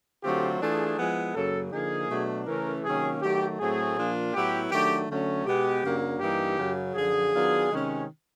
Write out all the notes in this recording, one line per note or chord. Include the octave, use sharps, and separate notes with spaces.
D3 F#3 A3 C4 F4 G4
E3 A3 D4 F4 G#4
F3 G#3 B3 E4
F#2 C#3 F#3 A#3 A4
D3 F3 A#3 D#4 G#4
B2 F#3 A3 D4
C#3 E3 A3 C#4 A#4
C3 D#3 F#3 A#3 C#4 G#4
D#3 F#3 A3 G4
A2 F#3 A3 C4 G#4
A#2 F3 A#3 D4 F4
A2 F#3 B3 E4 G4
D#3 F#3 A3 D4 G4
D3 F#3 A3 C#4
B2 G#3 B3 G4
F#2 C#3 F#3 A#3 D4
G2 E3 G3 A#3 D#4 G4
F#2 C#3 F#3
F#2 D3 F3 G#4
D#3 F#3 B3 D4 F4
C3 D#3 G#3 C#4